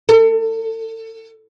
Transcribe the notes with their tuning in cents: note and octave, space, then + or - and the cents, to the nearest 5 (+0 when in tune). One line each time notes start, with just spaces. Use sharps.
A4 +35